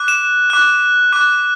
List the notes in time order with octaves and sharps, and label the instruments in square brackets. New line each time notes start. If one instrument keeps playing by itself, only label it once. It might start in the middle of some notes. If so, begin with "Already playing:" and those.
Already playing: [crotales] D6 F#6
E7
D6 F#6
D6 F#6